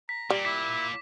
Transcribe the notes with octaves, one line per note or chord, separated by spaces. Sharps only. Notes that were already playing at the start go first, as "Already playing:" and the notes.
A#5 B6
A#2 G3
E4 D6 B6